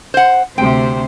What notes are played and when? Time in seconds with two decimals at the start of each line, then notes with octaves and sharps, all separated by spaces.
0.14 C5 F#5
0.58 D2 C3 C5 G5